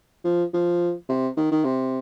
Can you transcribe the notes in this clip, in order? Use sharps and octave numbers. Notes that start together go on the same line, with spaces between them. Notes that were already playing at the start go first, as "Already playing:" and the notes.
F3
F3
C3
D#3
D#3
C3